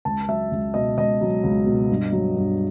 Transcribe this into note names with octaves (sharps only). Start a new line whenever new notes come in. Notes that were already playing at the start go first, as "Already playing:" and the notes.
C#2 A5
F#3 E5
C#2
B2 D#5
C#2 D#5
F#3
C#2
B2
G2
F#3
G2